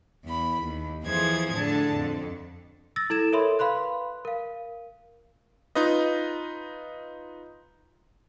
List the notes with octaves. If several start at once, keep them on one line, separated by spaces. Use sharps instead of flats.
E2 B5
D#2
F2 E3 F3 G#4 C5 G#6
A2 D3 A5
F2
E6 A6 A#6
E4 A4 G#6 E7
A4 A#4 C#5 E5 B5 C6
B4 F5 B5 C6 F#6
A#4 F5
D#4 F4 B4 D#5